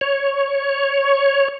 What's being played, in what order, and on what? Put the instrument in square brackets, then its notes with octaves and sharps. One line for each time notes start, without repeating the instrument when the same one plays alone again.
[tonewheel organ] C#5